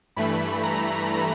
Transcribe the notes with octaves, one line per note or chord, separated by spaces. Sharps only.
G2 E3 A3 B5
A#5